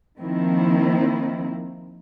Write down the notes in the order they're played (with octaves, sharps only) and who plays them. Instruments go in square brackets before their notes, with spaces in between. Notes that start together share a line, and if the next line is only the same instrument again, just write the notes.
[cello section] D#3 F3 A#3 C4 E4